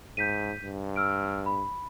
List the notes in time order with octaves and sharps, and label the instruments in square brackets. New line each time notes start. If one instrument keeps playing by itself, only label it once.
[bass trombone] G#2 [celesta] G6 B6 D#7
[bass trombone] G2
[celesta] E6 F6 D7
B5